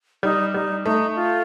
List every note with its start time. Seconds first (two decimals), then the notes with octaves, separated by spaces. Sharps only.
0.23 G3 D#4
0.54 G3 D#4
0.85 A3 D#4
1.16 F4